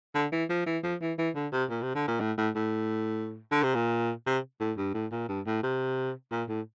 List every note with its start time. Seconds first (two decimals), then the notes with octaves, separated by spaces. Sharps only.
0.15 D3
0.32 E3
0.49 F3
0.66 E3
0.83 F3
1.01 E3
1.18 E3
1.35 D3
1.52 C3
1.70 A#2
1.82 C3
1.95 D3
2.08 A#2
2.20 A2
2.37 A2
2.55 A2
3.51 D3
3.63 C3
3.75 A#2
4.26 C3
4.60 A2
4.77 G2
4.94 A2
5.12 A#2
5.29 G2
5.46 A2
5.63 C3
6.31 A#2
6.48 A2